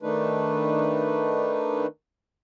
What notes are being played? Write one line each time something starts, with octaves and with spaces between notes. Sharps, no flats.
D#3 A3 D4 D#4 B4